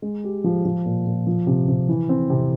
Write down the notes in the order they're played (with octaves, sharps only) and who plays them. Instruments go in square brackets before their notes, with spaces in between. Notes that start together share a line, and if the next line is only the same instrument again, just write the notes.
[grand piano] G#3
G4
F3
F3
A#2
A#2
F3
C3
C3
E3
C4
C3